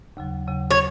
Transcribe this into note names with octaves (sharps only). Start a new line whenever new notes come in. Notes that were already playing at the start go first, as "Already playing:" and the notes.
D#2 C#3 F#3
D#2 C#3 F#3
C#5